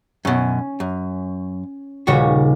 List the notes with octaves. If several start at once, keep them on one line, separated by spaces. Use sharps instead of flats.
F#2 B2 C#4
F#2
D#1 C#3 G3 F#4 C#5